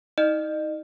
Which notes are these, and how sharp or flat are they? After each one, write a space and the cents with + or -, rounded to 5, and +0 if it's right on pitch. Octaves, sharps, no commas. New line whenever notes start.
D#4 +35 D#5 -35